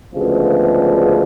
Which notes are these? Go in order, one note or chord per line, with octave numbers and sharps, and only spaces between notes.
D2 C#3 F3 G#3 B3